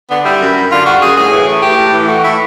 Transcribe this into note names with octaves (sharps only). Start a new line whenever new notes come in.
D3 B3
G3 E4
F#2
F#2
D3 F4
G3 F#4
F#2 G#4
A2 G#4
E3
A3
A2 G4
A2
E3
A3 F#4
A2 E4